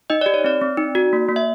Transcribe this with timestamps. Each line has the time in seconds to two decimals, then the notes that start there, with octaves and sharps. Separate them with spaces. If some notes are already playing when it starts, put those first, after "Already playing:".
0.10 D#4 D#5
0.21 G4 D5
0.34 C#5
0.44 C4 D5
0.61 C4
0.77 D#4
0.95 F#4
1.13 A#3
1.29 A#3
1.36 E5